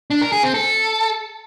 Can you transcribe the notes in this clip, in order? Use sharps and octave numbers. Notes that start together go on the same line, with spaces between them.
D4
A#4
G#4
C4
A4